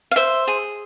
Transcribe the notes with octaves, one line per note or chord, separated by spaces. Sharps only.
F5
C5 E5
G#4